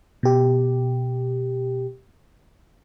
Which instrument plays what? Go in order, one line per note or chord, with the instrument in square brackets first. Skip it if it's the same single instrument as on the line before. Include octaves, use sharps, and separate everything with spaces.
[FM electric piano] B2 G4